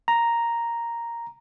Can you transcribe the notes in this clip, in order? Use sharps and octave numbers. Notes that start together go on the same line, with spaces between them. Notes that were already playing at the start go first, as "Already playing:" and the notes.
A#5